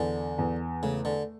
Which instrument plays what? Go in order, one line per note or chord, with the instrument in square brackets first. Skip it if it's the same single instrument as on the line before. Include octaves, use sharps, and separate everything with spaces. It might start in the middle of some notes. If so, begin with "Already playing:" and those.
Already playing: [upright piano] E2 [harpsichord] D3
[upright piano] E2
[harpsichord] C#3 [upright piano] A3
[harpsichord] D3